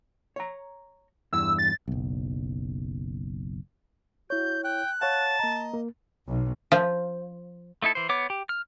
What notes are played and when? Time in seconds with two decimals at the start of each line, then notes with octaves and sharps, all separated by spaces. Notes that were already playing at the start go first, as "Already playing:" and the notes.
0.36 C#5 A#5
1.33 E2 G2 E4 E6
1.59 A6
1.88 F#1 B1
4.30 E4 F#4 C#5 G6
4.64 G5 F#6
5.01 C#5 F5 F#5 A5
5.39 A#3 D#5 A#5
5.74 A#3
6.27 B1
6.72 F3
7.82 A3 D#4 E4 A4
7.95 E3 C5
8.09 B3 C#5 D6
8.30 G4
8.49 F6